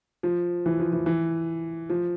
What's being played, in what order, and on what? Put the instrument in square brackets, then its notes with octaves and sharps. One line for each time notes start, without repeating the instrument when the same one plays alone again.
[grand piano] F3
E3
F3
E3
E3
F3